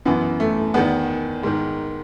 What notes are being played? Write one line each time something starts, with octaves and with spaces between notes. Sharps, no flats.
F#2 E3 B3
A3
E2 D#3 B3
G#2 D#3